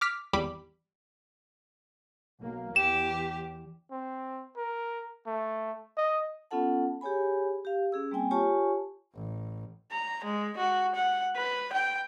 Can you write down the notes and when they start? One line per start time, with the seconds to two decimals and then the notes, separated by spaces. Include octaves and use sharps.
0.01 D6 F6 B6
0.33 G#1 E2 G3 B5 D6
2.41 B1 A#3
2.76 E2 G4 E7
3.91 C4
4.57 A#4
5.26 A3
5.97 D#5
6.51 B3 C#4 F4 A4 F#5 A5
7.01 G4 G#4 C#5 G#5 B5
7.65 G4 F5
7.92 C#4 G#4 E6
8.11 G3 A#3 C4 G5 G#5
8.31 F4 G4 C#5 G#5 A5 C#6
9.15 A1
9.92 A#5
10.25 G#3
10.58 F#4
10.95 F#5
11.37 B4
11.73 G5